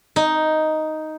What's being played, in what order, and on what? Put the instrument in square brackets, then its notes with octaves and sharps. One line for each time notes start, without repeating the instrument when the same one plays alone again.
[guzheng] D#4